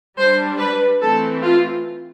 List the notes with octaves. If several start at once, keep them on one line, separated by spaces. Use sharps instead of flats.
G3 D4 C5
B4
E3 A3 C4 A4
F4